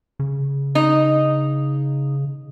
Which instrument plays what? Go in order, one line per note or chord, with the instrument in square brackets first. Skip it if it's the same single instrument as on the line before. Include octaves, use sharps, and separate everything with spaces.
[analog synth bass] C#3
[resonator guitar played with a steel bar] D#4